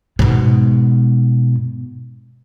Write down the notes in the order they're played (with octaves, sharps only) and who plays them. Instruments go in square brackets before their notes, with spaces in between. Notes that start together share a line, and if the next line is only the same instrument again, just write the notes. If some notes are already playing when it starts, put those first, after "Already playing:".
[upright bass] G#2 B2